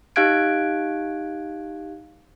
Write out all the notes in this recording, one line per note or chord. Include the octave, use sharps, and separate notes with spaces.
D#4 G4 F5 F#6 G#6 D7